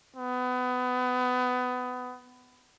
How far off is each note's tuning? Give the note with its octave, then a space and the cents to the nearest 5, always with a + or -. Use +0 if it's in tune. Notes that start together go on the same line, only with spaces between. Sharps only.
B3 +25